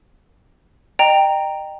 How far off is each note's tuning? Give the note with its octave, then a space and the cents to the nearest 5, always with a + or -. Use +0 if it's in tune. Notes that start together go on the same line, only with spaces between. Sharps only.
D#5 -30 G5 +0 A#5 +0